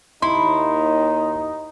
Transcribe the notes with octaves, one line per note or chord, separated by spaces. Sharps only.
D#2 D#4 E4 C6